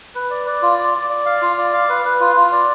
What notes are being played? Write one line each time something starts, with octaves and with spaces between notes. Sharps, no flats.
B4
D5
D5
F4
D5
D5
D5
F5
F4
D5
F5
B4
B4
F4
F4
D5